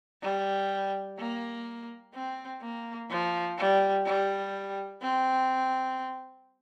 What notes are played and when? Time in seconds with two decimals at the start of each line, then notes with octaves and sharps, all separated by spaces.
0.22 G3
1.18 A#3
2.14 C4
2.62 A#3
3.10 F3
3.58 G3
4.06 G3
5.02 C4